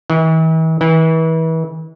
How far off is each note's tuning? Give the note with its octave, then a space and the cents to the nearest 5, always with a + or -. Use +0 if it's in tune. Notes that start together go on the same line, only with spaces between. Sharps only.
E3 -45
E3 -35